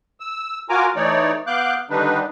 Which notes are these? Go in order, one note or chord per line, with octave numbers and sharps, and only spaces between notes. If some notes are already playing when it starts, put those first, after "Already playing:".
E6
F4 F#4 A#4 G#5 A#5 D6
E3 A3 D#4 C#5 D5
B3 F5 D6 F#6 G6
D3 D#3 G3 D4 D#4 B4